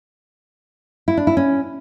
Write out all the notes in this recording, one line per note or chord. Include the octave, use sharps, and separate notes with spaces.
E4
D4
E4
C#4